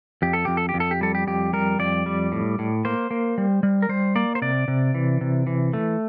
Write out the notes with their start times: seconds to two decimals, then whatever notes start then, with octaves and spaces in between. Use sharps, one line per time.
0.22 F2 G4
0.33 A4
0.45 F2 G4
0.57 A4
0.69 G4
0.74 F2
0.80 A4
0.91 G4
1.01 G3 A4
1.15 G4
1.27 F2 G4
1.53 G3 A#4
1.79 F2 D5
2.06 G3
2.32 A2
2.59 A2
2.85 A#3 C5
3.11 A#3
3.38 G3
3.63 G3
3.82 A#4
3.89 G3 C5
4.15 A#3 D5
4.35 C5
4.42 C3 D5
4.68 C3
4.94 E3
5.21 C3
5.47 E3
5.73 A3